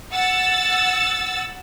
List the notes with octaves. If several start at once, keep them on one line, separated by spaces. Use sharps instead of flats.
F#5 E6 A6